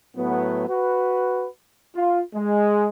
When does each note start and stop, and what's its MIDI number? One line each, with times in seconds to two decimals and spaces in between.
0.15 0.67 45
0.15 0.67 54
0.15 0.67 59
0.67 1.46 66
0.67 1.46 71
1.95 2.20 65
2.34 2.88 56